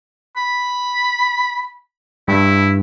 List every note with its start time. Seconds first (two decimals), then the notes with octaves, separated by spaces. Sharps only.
0.36 B5
2.28 G2 E4